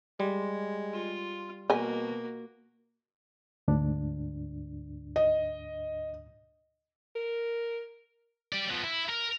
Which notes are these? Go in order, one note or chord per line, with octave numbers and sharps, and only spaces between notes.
G3 G#3
F4
B2 A#3 F#4 D#5 G#5
D2 G#2 D4
D#5
A#4
G4 D5
F3 B3
E4
A#4